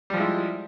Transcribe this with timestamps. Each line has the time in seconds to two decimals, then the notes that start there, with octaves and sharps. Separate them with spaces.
0.10 G3
0.13 F3
0.17 G#3
0.20 E4